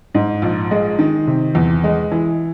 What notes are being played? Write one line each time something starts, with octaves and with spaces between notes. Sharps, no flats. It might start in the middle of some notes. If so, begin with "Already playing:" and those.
G#2
A#1
G#3
D#3
C3
E2
G#3
E3